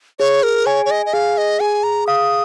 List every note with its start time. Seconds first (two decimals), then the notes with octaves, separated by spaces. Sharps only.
0.19 G#4 C#5
0.43 A#4
0.66 C#5 G#5
0.86 C#5
0.91 D#5
1.06 D#5
1.13 G#4 F5
1.38 D#5
1.60 G#4 G#5
1.83 A#5
2.07 F5 D#6